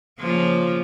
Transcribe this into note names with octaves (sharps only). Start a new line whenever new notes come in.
C#3 F3 A#3